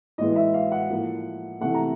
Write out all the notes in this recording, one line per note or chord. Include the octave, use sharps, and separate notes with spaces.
A2 E3 G#3 B3 D#5
E5
F5
F#5
A2 F3 A#3
C3 E3 A3 F#5
A#5